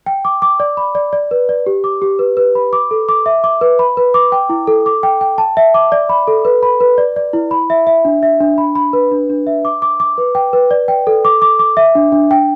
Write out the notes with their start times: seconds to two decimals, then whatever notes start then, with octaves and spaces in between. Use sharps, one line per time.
0.06 G5
0.25 D6
0.42 D6
0.60 D5
0.77 B5
0.95 D5
1.13 D5
1.31 B4
1.49 D5
1.66 G4
1.84 D6
2.02 G4
2.19 B4
2.37 B4
2.55 B5
2.73 D6
2.91 A4
3.09 D6
3.26 E5
3.44 D6
3.61 B4
3.79 B5
3.97 B4
4.14 D6
4.32 G5
4.49 E4
4.67 A4
4.86 D6
5.03 G5
5.21 G5
5.38 A5
5.57 E5
5.74 D6
5.92 D5
6.09 B5
6.27 A4
6.45 B4
6.63 B5
6.80 B4
6.98 D5
7.16 D5
7.33 E4
7.51 B5
7.70 E5
7.87 E5
8.05 D4
8.23 E5
8.41 D4
8.58 B5
8.75 B5
8.93 B4
9.11 D4
9.30 D4
9.47 E5
9.65 D6
9.82 D6
10.00 D6
10.18 B4
10.35 G5
10.53 B4
10.71 D5
10.88 G5
11.07 A4
11.25 D6
11.42 D6
11.59 D6
11.77 E5
11.95 D4
12.12 D4
12.31 G5